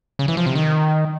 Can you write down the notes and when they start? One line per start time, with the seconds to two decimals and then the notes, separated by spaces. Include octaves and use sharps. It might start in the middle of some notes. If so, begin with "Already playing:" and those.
0.19 C#3
0.28 E3
0.37 F3
0.46 C3
0.55 D#3